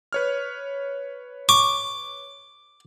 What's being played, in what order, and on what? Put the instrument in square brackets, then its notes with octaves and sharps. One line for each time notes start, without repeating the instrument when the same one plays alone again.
[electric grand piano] B4 C#5 F6
[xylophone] C#6 [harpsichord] D6